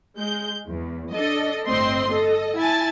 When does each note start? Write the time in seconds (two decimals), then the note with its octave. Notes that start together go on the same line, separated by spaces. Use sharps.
0.16 G#3 G6
0.69 E2
1.12 D4 A4 D#5
1.67 G1 A2 C4 D#5 C6
2.08 A4 D#5
2.57 E4 G#5 A5 A6